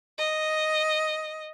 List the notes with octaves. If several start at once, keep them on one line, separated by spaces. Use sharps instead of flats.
D#5